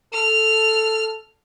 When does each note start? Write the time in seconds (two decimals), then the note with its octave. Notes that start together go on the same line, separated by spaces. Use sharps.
0.13 A4 F6